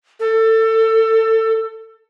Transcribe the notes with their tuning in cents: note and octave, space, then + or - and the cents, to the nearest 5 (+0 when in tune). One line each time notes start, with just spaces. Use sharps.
A4 +25